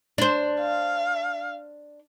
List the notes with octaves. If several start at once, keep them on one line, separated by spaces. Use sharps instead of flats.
D4 C5
F5